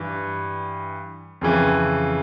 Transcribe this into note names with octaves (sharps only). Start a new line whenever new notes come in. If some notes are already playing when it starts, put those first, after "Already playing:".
Already playing: G2 E3
F2 C#3 E3